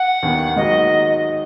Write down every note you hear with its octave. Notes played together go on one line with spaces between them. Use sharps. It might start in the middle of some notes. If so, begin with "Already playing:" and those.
Already playing: F#5
D#2 D#3 B3
G#2 D#3 F#3 D#4 D#5